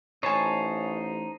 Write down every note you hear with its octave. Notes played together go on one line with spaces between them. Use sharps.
A1 D#4 C5 C#5 G#5 A5